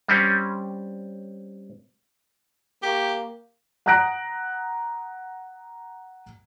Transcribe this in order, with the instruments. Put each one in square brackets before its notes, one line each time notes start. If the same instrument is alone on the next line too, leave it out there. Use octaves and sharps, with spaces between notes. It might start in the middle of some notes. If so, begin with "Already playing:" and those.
[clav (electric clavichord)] G3 C4 C#4
[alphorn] A#3 [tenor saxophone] G4
[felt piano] F#5 A#5 D#6 F#6 A#6 D7